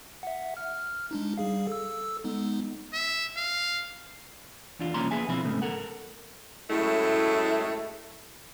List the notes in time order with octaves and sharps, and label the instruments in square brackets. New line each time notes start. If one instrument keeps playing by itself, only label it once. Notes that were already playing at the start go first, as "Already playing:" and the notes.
[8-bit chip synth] E5 F#5
F6
G#3 D4 D#4
G3 G#4 F5
A4 E6
G#3 B3 D#4
[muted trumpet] E5
F5
[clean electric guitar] E2 D4 F4
C2 F3 A#3 C#4 A#5 C6
A#3 B3 G#4 E5 G#5
B2 F3 C4 E4 F4
C2 G#2 C#3 A3 B3
A4 A#4 F#5
[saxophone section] F#2 A2 G#3 A3 E4